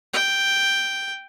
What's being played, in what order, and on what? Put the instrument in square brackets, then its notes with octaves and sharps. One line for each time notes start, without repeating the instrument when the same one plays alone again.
[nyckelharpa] G5